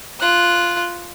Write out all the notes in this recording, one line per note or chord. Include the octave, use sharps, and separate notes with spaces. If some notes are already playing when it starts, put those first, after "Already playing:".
F4 F#6